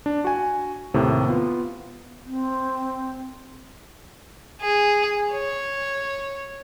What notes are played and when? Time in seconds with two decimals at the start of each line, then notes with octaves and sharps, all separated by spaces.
0.06 D4
0.24 F#4 G#5
0.94 D#2 A2 C3
1.26 B3 F4
2.26 C4
4.61 G#4
5.32 C#5